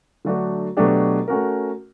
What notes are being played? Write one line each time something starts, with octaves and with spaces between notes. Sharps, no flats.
D3 F#3 A3 D4 F#4
B2 F#3 A3 D4 G4
A3 C#4 F#4 A#4